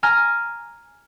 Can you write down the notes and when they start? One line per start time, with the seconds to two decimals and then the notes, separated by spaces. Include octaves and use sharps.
0.03 G#5 A#5 F6